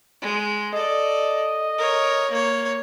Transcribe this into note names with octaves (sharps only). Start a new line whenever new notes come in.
G#3
A4 D5 D#5
A#4 C#5
A#3 C#5